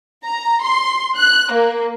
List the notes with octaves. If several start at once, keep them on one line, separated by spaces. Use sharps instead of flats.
A#5
C6
F#6
A#3